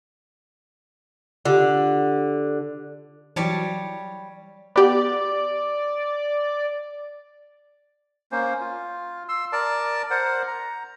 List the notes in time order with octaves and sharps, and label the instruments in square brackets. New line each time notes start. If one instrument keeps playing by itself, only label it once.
[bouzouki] D3 [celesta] F4 G4
[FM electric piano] E3 F#3 [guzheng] G3 C#5 A5
[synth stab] B3 G4 [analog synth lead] D5
[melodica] A#3 C#4 C5
F4
C6 E6
A#4 D5 A5
A#4 C5 F#5
A#5